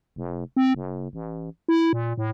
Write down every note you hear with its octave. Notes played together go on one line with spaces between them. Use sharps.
F1
C4
F#1
A1
E4
A#2
A2